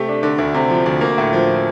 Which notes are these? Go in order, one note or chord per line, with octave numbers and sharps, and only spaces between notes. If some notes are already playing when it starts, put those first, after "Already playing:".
Already playing: C3 A3 G4
D4
D3
D2
C3
F3
D2
A#3
A2
F3